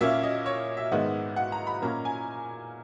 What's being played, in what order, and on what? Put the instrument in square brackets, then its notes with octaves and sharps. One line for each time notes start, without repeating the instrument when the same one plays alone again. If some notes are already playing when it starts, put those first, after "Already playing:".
[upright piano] A#2 A#3 C#4 E5
D#5
C#5
E5
G#2 D#3 G#3 B3
F#5
A#5
B5
A#2 A#3 C#4 A#5
G#5